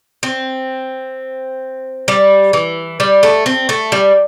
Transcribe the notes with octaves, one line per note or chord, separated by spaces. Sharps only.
C4
G3
E3
G3
A3
C4
A3
G3